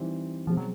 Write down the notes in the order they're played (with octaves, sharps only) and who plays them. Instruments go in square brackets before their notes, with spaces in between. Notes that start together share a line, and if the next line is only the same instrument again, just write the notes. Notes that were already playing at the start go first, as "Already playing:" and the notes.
Already playing: [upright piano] E3 G3 C4 D#4
[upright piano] B2 G#3 C4 [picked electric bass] F3
[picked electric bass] F#3